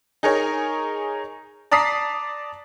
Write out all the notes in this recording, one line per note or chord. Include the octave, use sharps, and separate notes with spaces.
D#4 G#4 A#4 C#5
D5 A5 A#5 D#6 B6 C7